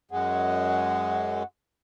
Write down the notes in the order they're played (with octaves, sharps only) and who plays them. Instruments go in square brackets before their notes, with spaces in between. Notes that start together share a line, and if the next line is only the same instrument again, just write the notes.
[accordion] F#2 G#3 [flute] F#5